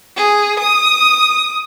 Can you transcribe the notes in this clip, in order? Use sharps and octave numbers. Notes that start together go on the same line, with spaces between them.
G#4
D#6